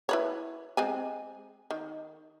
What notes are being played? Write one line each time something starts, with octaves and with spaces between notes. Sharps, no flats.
E4 B4 C#5
G#3 C4 G#5
D#3